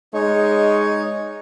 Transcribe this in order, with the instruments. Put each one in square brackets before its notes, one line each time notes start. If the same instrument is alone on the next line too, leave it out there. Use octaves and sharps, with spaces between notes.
[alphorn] G#3 [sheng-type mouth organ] D#4 C#5